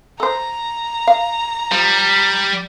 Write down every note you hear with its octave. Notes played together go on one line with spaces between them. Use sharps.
A4 C5 A#5
F5
F3 G3